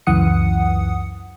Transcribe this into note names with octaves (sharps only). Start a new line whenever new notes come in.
C#2 F#2 E3 F#5 D#6 C#7